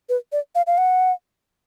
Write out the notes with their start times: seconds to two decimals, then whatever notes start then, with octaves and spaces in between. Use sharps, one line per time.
0.09 B4
0.32 D5
0.55 F5
0.67 F5
0.78 F#5